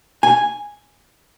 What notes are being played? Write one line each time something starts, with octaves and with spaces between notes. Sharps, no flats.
G#5